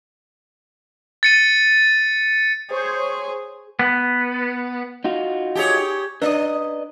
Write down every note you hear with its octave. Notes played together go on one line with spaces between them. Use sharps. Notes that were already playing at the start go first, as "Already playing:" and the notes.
A6 C#7 D#7
G#4 C5 C#5
B3
D#4 F4 F#4
G4 G#4 C#5
D4 B4 D5 D#5